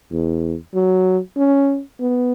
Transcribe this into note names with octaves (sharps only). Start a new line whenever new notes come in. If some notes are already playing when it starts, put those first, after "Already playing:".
E2
F#3
C#4
B3